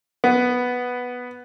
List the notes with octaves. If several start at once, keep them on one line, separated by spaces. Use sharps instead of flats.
B3